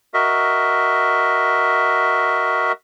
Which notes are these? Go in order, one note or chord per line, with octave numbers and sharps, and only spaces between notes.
F#4 A#4 D#5 E5